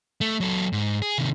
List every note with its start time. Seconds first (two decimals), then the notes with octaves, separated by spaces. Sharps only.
0.21 A3
0.40 F#3 A4
0.73 G#2
1.02 G#4
1.18 C3 D#3